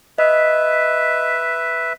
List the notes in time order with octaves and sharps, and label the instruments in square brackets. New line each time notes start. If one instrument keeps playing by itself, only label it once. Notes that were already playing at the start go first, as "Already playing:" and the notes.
[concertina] B4 E5 [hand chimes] D#5